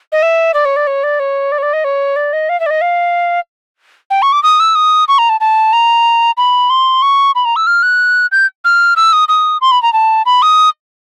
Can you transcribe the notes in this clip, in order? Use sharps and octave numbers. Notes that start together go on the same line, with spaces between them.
D#5
E5
D5
C#5
D5
C#5
D5
C#5
D5
C#5
D5
D#5
C#5
D5
D#5
F5
E5
D5
D#5
F5
G5
C#6
D6
D#6
E6
D#6
C#6
A#5
A5
A5
A#5
B5
C6
C#6
B5
A#5
E6
F6
F#6
G6
F6
E6
D#6
D#6
C6
B5
A#5
A5
B5
D#6